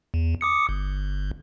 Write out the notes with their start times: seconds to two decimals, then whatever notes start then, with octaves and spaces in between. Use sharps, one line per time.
0.14 E2
0.41 D6 D#6 C#7
0.69 G1